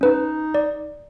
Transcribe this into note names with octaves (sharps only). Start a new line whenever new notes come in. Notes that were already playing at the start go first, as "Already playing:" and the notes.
C#4 D#4 B4
D5